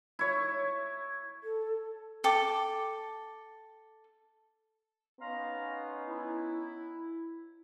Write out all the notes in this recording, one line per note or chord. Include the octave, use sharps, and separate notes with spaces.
E4 C#5
A4
A4 G5 D6
B3 C#4 D#4 F5 A#5 C6
E4